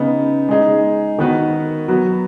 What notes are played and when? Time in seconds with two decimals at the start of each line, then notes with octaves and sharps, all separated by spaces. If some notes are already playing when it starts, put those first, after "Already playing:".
Already playing: C#3 B3 D#4
0.49 G#3 D#4 G#4
1.18 D#3 B3 F#4 B4
1.88 F#3 B3 F#4